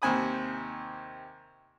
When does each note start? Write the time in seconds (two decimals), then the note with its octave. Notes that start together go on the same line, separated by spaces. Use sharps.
0.02 D#2 C3 C5 G#5 B5 D#6